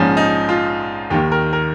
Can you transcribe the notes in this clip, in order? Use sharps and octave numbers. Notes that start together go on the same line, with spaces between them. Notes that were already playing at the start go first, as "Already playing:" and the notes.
Already playing: A#1 G#2 F3 C#4
D#4
F4
D#2 D#3 G4
A#4
A#4